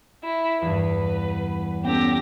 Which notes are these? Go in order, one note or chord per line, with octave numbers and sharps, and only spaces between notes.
E4
E2 G2 B4
B3 C#4 G4 A4 G5 A#6